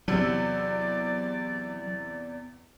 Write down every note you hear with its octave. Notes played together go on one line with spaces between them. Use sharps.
E2 C3 F#3 D5 E6